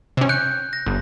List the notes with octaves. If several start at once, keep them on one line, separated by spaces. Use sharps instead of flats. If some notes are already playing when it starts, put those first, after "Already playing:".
C3 C#4
F#6 G6 C#7
A#6
G1